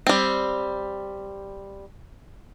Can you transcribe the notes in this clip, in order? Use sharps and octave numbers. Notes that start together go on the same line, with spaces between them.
G3 C4